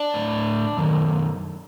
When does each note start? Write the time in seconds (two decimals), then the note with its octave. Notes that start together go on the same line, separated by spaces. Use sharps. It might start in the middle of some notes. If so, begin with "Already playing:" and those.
Already playing: D4 D5
0.14 A2
0.77 F#2 D#3